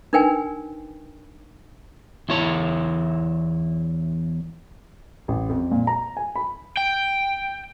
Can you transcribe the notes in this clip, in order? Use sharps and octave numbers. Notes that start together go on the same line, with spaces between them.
D4 D#4 A#4 B4 G5 G#5
E2 E4 C#5
A1
F2
A#2
A#5
G#5
B5
G5